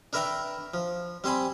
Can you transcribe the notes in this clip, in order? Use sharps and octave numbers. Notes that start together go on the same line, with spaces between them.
D4 A#4 B4 E5 G5 A#5
F3
G3 C4 C5 G#5 B5